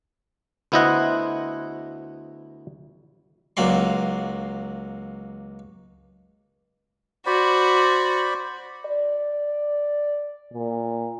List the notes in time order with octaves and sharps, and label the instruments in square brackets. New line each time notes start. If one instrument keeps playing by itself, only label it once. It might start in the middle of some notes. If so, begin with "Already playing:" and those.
[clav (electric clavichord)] D2 B3 E4 C5 D#5 F#5
[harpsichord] C#2 F#3 A#3 D5 C6
[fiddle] F#4 [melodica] C5 D5 B5
[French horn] D5
A#2